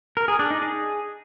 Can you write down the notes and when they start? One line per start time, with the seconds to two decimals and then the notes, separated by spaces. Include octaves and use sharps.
0.17 A#4
0.28 G#4
0.39 D4
0.51 D#4
0.62 G#4